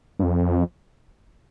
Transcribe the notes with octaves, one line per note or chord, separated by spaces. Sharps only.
G2
F2